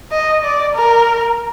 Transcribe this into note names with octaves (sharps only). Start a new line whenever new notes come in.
D#5
D5
A#4